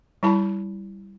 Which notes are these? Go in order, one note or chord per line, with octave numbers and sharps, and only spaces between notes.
G3 E4 A5 B5